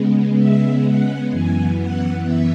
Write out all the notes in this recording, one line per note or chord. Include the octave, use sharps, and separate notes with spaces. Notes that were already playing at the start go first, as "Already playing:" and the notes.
Already playing: C#3 G#3 B3
E5
F#5
F#2 E3 B3 G#5
F#5
E5